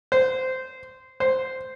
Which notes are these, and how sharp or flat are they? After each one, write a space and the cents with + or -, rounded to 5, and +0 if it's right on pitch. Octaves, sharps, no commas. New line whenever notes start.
C5 -15
C5 -5